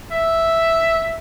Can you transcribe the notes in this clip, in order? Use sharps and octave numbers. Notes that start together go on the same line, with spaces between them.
E5